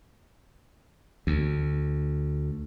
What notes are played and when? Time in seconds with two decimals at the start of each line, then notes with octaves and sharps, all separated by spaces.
1.27 D2